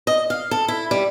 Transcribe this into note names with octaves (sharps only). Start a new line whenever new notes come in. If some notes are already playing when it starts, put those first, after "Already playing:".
D#5
F5
A4
E4
G3